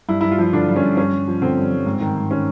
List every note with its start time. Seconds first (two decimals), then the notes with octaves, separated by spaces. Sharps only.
0.09 G2 E4
0.21 G2 E4
0.31 F4
0.38 F3 E4
0.53 D3 D4
0.69 G2
0.76 C#4
0.83 G2
0.97 G2 C#4
1.12 G2
1.28 F3
1.42 D3 C4
1.57 G2
1.72 G2
1.86 G#2
2.01 D#3
2.16 G#2
2.31 D#3 C#4